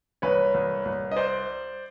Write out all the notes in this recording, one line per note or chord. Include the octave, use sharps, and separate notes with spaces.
C2 B4 C#5
C2
C2
D#5
C5 D5